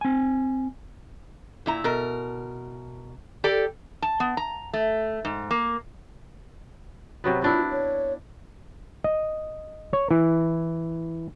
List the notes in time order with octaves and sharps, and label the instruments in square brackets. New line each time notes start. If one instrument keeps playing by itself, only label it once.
[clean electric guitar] C4 G#5
[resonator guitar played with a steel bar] A#2 E4 A#5
B2 A#4
G4 A4 D5
A5
B3
A#5
A3
G#2
A#3
[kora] C3 F#3 B3
[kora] B3 D4 E4 [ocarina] F4
[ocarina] C#5
[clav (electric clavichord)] D#5
C#5
E3